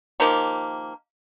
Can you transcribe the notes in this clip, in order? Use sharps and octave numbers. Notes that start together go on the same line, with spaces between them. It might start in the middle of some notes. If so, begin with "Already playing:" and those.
D#3 F3 A#3 G4